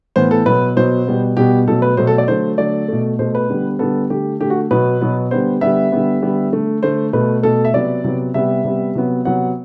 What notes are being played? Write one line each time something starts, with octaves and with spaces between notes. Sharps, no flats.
A2 E3 B3 C5
A4
B2 F#3 B3 B4
B2 F#3 B3 C5
B2 G3 B3
B2 G3 B3 G4
B2 F#3 A3 A4
B4
B2 F#3 A3 C5
A4
D5
D3 F#3 A3 C5
D3 F#3 A3 D5
B2 A3
B2 A3 C5
B4
D3 G3 B3
D3 G3 B3 A4
D3 A3 G4
D3 A3 G4
F#4
B2 F#3 B3 B4
B2 F#3 B3
D3 G3 B3 C5
D3 G3 B3 E5
D3 G3 B3
D3 G3 B3
D3 A3
D3 A3 C5
B2 A3 B4
B2 A3 A4
E5
C3 F#3 B3 D5
C3 F#3 B3
C3 G3 B3 E5
C3 G3 B3
C3 F#3 B3
C3 F#3 B3 F#5